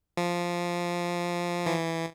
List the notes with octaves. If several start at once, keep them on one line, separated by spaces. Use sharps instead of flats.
F3
E3